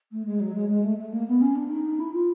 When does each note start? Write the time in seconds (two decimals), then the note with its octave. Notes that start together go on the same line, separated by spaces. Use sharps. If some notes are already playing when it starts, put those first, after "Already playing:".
0.11 A3
0.25 G#3
0.40 F#3
0.54 G#3
0.69 G#3
0.83 A3
0.98 A3
1.12 A#3
1.27 B3
1.41 C#4
1.55 D4
1.69 D#4
1.99 E4
2.13 F4